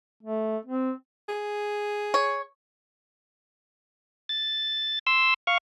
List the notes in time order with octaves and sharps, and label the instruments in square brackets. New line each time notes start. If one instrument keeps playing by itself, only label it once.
[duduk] A3
C4
[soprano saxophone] G#4
[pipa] C#5
[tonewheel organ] A6
C6 E6
F5 C#6